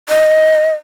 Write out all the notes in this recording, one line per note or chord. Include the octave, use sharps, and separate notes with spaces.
D#5